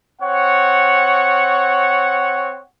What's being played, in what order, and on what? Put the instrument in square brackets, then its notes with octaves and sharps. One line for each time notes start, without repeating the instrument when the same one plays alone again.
[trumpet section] C4 C#5 F#5